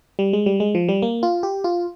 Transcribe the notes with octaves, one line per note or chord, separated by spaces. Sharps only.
G3
G#3
G3
G#3
F3
G3
A#3
F4
G4
F4